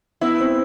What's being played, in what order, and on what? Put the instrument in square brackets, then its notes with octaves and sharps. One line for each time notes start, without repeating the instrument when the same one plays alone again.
[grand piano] B3 [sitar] E4
[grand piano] C4